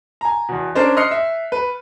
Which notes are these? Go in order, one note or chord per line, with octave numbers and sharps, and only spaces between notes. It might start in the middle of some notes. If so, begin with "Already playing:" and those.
G#5 A#5
E2 B2
C#4 D4 A#4 C5 D5
D#5 C6 F6 F#6 C7 C#7
E5
B4